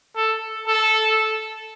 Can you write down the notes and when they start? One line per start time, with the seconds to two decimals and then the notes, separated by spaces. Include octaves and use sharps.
0.16 A4
0.68 A4